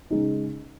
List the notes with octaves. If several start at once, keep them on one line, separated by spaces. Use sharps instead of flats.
C#3 G#3 D#4